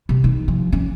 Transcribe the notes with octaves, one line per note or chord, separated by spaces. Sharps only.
C3
D#3
F3
C#4